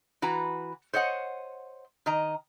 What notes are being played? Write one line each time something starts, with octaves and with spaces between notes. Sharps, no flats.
E3 F#4 B4 A#5
C5 C#5 D#5 F#5
D#3 D#5 A#5